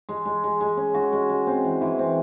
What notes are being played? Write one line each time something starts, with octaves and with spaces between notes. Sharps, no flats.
G#3
G#3
G#3
G#3
C#4
F#4
G#3
G#3
C4
E3
E3
C4